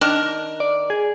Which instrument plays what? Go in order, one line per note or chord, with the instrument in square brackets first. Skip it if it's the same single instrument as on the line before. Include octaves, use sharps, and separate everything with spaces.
[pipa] D#3 D4 A#4
[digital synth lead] D5
G#4